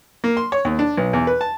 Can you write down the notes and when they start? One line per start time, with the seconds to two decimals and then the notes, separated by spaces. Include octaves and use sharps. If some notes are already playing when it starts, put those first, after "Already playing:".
0.24 A#3
0.37 C6
0.52 C#5
0.65 D#2
0.79 D4
0.97 B1
1.13 E2
1.27 B4
1.41 A5